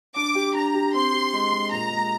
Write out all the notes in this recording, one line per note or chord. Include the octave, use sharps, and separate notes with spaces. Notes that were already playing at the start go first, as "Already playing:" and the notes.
D4 D6
G4
D4 A#5
G4
C4 C6
G4
G#3
G#3
A#2 A#5
G#3